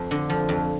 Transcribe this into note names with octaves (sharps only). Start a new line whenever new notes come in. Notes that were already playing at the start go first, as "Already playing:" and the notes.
Already playing: F2 C5
D3
F3
F2